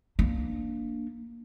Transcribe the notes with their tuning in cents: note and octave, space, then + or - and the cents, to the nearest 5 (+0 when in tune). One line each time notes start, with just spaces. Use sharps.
A#3 +0 D4 +0